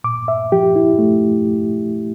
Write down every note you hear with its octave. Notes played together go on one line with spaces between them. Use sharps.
A#2 D6
E5
F3 G4
E4
A3